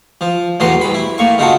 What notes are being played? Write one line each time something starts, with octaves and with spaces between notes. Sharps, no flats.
F3
E2 A2 E3 F#3 A#5 C6
C2 B5
E4
A2 A#3 C#6
C#3 D#4 F4 F#4 A4